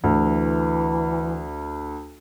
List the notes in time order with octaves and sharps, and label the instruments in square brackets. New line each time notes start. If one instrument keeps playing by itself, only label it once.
[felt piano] D2 [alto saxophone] E3